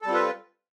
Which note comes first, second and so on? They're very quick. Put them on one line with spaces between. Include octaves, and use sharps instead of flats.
A4 G3 C4 F4 B4